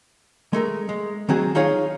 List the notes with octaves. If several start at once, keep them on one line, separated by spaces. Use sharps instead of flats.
G#3 A3 A#4
G#3
D#3 F#3 C4 F#4 G#4
D#4 F4 G#4 C#5 F5